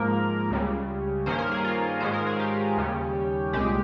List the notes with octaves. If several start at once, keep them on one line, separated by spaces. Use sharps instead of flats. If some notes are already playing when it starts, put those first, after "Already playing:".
Already playing: G#2 F3 A#3 A#4
C#2 C#3 G3
G2 D#3 A#3 C#4 C5
A#4
G#4
F4
G#2 D#3 G#3 C#4 C5
A#4
G#4
G4
D#2 C#3 G3 C#4
C2 A#2 G#3 G4